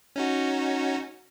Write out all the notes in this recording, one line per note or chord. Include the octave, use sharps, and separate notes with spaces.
C#4 D#4 F#4